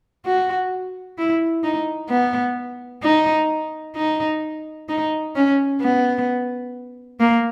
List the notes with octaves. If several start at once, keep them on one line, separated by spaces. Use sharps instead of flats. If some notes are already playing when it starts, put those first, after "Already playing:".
F#4
E4
D#4
B3
D#4
D#4
D#4
C#4
B3
A#3